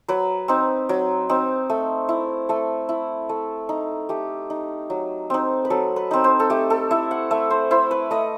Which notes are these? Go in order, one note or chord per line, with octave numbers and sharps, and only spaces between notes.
F#3 B4
C4 D#4
F#3
C4 D#4
A3
E4
A3 A4
E4
A3
D#4
A3 G4
D#4
F#3
C4 D#4
B4
F#3 A4
B4
C4 D#4
C5
A4
A3 G4
A4
E4 E5
F#5
A3 E5
C5
E4 C5
B4
A3 D#5